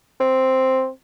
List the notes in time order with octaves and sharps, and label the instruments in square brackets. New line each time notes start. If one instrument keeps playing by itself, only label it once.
[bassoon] C4